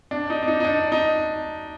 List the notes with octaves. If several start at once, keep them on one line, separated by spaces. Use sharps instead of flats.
D4
D#4
D4
D#4
D#4
D4
D#4